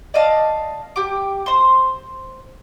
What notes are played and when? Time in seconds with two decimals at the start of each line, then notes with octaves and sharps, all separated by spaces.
0.14 D5 D#5 F5 A5
0.96 G4 D6
1.46 C5 C6